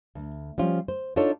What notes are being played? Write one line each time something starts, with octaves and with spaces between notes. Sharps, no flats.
D2
F3 G3 C#4 F4
C5
D4 D#4 F4 A4 C#5